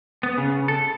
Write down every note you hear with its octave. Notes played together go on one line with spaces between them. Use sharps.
B3
C#3
A4